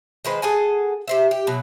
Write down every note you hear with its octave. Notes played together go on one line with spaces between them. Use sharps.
D#3 G#3 B4 C5
G#4 A4 F#5 G#5
G4 C5 E5
G4
B2 F#3